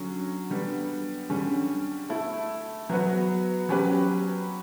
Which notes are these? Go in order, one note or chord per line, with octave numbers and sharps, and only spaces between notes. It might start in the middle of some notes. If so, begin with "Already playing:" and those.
Already playing: D3 F#3 C#4
D3 G3 B3
D3 G3 C#4
A3 E4 A4
F#3 B3 F#4 B4
F#3 C#4 G4 B4